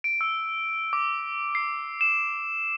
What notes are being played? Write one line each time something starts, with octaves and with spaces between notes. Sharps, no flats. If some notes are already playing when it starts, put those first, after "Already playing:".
D7
E6
D6
C7
E7